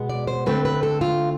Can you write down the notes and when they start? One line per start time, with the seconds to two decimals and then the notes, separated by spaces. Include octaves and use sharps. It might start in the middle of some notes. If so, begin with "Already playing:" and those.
Already playing: B2 G#3 B3
0.09 D5
0.27 C5
0.46 D3 A3 C4 B4
0.65 B4
0.83 A4
1.01 F4